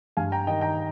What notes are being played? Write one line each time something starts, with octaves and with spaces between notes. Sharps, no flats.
G2 F5 G#5
G5 A#5
D#3 D#5 G5
G5 A#5